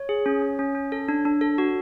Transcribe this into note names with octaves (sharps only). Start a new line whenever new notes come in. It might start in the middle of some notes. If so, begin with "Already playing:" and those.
Already playing: C#5
G#4
C#4
C#4
C#4
C#4
A4
D4
D4
A4
F#4